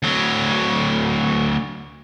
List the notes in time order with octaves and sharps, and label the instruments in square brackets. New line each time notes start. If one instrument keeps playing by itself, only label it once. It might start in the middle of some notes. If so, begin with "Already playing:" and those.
[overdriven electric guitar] D2 F#3